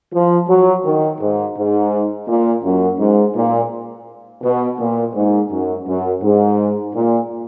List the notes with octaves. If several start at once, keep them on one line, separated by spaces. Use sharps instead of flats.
F3
F#3
D#3
G#2
G#2
A#2
F#2
G#2
A#2
B2
A#2
G#2
F#2
F#2
G#2
A#2